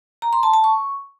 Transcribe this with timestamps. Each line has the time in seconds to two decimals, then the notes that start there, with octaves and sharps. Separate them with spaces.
0.22 A#5
0.33 C6
0.43 A5
0.54 A5
0.64 C#6